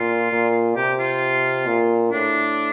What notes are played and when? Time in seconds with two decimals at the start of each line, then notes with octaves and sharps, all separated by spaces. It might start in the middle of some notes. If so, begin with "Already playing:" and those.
Already playing: A#2 F4
0.32 A#2
0.76 C3 G4
0.99 F4
1.67 A#2
2.11 A2 D4